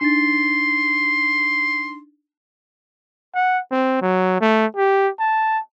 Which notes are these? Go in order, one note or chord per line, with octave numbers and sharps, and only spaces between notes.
D4 D#4 C6 A6
F#5
C4
F#3
A3
G4
A5